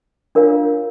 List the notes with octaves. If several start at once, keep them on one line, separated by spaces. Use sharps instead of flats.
D4 F4 A#4 C#5 F5